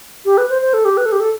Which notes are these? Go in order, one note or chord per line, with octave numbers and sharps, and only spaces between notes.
G4
B4
C5
C5
A4
G4
B4
A4
G4
A4